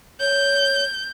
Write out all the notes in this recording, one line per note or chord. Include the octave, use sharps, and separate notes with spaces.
C#5 G6